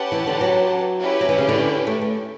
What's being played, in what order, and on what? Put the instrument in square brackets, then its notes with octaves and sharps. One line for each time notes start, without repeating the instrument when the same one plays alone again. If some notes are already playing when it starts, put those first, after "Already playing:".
Already playing: [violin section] C#4 G4 B4 F#5 A5
[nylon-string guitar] E3
D3
F#3
[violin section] C#4 E4 G4 B4
[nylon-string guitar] F#3
E3
C#3
D3
A3
A3